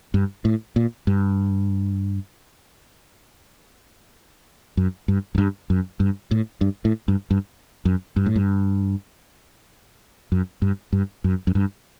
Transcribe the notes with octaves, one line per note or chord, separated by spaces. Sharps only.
G2
A2
A#2
G2
F#2
G2
F#2
G2
F#2
G2
A2
G2
A2
G2
G2
F#2
G2
A2
G2
F#2
G2
G2
F#2
F#2
G2